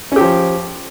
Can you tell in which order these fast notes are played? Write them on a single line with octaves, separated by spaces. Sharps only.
C#4 G4 F3